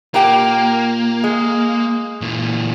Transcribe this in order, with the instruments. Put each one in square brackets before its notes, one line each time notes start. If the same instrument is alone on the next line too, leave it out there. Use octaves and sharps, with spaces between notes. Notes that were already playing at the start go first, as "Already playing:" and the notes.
[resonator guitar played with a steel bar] A#2 G4 G5 [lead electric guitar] A#3
[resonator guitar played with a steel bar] G#3
[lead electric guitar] A#2 E3